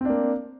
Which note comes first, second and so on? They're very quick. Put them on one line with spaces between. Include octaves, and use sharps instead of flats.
C4 D4 A#3